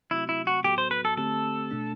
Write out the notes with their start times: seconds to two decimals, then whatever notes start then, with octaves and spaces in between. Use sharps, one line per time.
0.11 C3 F#3 A3 C4 E4 F#4
0.29 E4
0.47 F#4
0.64 A2 F#3 B3 F#4 G4 A4
0.78 C5
0.91 B4
1.05 A4
1.17 D3 A3 C4 G4 A4
1.71 B2 A3 D4